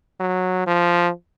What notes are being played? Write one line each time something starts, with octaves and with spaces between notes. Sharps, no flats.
F#3
F3